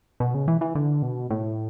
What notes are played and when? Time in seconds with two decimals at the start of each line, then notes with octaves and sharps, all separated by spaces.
0.20 B2
0.34 C#3
0.48 E3
0.61 E3
0.75 D3
1.02 B2
1.30 A2